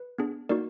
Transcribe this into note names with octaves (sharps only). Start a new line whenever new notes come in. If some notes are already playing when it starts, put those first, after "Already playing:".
Already playing: B4
B3 D4 G#4
A#3 D#4 F#4 A#4 D5